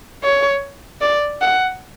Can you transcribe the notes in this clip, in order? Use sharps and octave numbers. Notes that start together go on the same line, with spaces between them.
C#5
D5
F#5